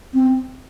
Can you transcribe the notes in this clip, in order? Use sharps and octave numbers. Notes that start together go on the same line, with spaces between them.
C4